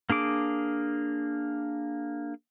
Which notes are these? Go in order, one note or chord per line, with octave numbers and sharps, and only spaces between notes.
A#3 D4 G#4 D6